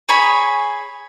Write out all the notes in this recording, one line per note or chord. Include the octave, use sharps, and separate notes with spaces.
G#4 C#5 G#5 B5